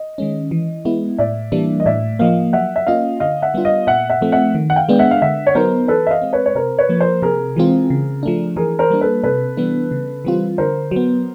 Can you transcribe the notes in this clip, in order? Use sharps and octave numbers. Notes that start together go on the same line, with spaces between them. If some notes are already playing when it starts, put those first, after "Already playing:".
Already playing: D#5
D#3 G#3 C#4
E3
G#3 B3 E4
A2 D5 E5
E3 G3 A#3 D4
D#5
A2 D5 E5
F3 A#3 D#5 F5
F#3 E5 F#5
E5
A#3 C#4 F4 D#5 F5
D3 D#5 F5
E5 F#5
G3 B3 D4 F4
D#5 F5
A#2 E5 F#5
E5 F#5
F3 A3 C4
E5 F#5
D#3
F#5
F5 G5
G#3 B3 D4
E5 F#5
F5
D3 E5 F#5
C#5
F#3 B3 D#4 A#4 C5
E3 A4 B4
E5
D#5 F5
G#3 C4
B4 C#5
C#5
C3 A#4 C5
B4 C#5
F3 A#3
A#4 C5
C3 G#4 A#4
E3 G#3 C4 F4
C#3
F3 A3 D4
E3 G#4 A#4
A#4 C5
G3 A#3 D4
A4 B4
C3 A4 B4
E3 G3 B3 D4
C#3
E3 G3 C4 F4
D3 A#4 C5
F#3 B3